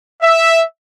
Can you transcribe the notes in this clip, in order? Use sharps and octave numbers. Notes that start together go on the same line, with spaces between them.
E5